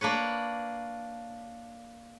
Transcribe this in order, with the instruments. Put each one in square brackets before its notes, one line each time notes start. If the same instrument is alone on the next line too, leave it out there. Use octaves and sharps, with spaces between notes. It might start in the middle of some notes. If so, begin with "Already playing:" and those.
[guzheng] A#3 D4 B4 C#5